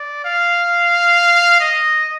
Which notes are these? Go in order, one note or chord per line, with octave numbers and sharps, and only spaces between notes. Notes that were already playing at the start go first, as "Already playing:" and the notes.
Already playing: D5
F5
D#5